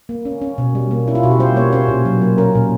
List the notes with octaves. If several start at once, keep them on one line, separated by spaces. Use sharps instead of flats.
A#3
C#4
C#4
B2
G3
A#3
C#4 E4
F4
B2 F#4
G4
G3 C5
A#3 C#5
C#4 C5
A#2
F#3
A#3
C#4 A#4
A#2